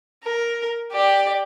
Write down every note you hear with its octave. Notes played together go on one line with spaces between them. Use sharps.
A#4
G4 D5